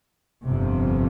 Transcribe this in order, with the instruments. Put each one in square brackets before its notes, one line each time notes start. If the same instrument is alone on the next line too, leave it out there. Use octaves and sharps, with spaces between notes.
[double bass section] G1 F2 C3 F3